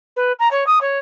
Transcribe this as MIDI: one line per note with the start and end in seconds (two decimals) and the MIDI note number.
0.16 0.32 71
0.39 0.48 82
0.51 0.64 73
0.67 0.79 87
0.81 0.98 73